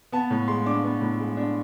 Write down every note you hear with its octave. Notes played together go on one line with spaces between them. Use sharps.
B3 A5
A2
G#3 C6
D4 D6
B3
A2
G#3
D4